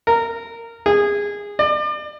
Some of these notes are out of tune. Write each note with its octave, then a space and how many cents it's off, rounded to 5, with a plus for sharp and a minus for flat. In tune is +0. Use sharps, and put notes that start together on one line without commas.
A#4 -15
G#4 -20
D5 +35